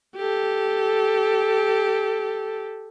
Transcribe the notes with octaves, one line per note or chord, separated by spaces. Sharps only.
G4 A4